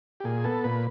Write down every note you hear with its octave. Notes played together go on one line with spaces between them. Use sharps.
G4
A#2 G#4
B3 A4
A#2 B4